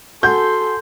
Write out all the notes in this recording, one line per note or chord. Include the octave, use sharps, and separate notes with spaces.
F#4 A4 G#5 C6 G6